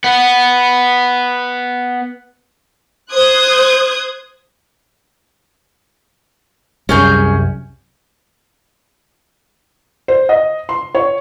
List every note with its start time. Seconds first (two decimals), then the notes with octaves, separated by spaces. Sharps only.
0.04 B3 F#5
3.12 C5 D#6 F#6 G#6
6.89 C2 F#2 G3 C#4 G#4 G6
10.08 C5
10.29 D#5
10.69 C6
10.95 C#5